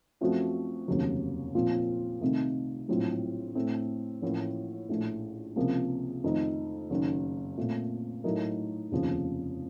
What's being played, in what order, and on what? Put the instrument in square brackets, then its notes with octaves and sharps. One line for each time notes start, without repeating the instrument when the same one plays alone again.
[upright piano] F#2 F3 A3 C4 F#4
F1 D#2 C#3 F#3
A#2 F3 C4 F4
C2 C3 D#3 A3 D#4
A#1 A2 F#3 C4 F4
A2 A3 C4
A1 A2 F3 A#3
A#1 A2 A3
C#2 C3 F3 A#3
F2 D#3 A3 D#4
F#1 F#2 D#3
A#2 A3 C4
A2 F#3 A3 D#4 A#4
F1 D#2 C#3 F3